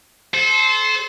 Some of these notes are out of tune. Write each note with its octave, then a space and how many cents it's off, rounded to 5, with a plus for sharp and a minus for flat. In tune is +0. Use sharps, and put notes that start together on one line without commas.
A4 -30 C5 +0